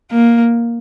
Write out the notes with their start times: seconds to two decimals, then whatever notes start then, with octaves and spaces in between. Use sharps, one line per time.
0.11 A#3